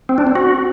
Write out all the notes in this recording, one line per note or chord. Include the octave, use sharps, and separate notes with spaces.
C4
D4
C4
F#4